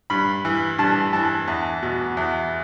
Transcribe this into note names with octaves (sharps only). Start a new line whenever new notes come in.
G2 B5
E3
G2 A5
E3 A5
E2
B2
E2